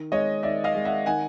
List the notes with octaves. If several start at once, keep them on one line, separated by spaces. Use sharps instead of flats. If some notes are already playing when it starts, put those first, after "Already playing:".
Already playing: D#3
G#3 C#5 D#5
D#3 D5 E5
D#5 F5
G#3
E5 F#5
D#3 F#5 G#5